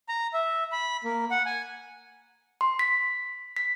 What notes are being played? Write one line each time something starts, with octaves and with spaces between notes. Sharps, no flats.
A#5
E5
B5
A#3
F#5
G#5
C6
B6
B6